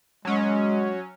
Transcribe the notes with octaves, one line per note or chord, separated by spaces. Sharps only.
F#3 G#3 C#4